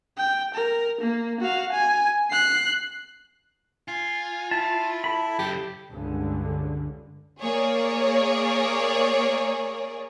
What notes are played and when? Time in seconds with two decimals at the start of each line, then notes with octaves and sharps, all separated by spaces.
0.17 G5
0.54 A#4
1.01 A#3
1.40 F#4 F5
1.72 G#5
2.31 F#6 C7
3.88 F4 G#5
4.51 E4 A5
5.04 A4 B5
5.39 F#2 C#3 G4
5.89 C#2 G2 D3
7.42 A#3 G#4 A#4 C#5 D5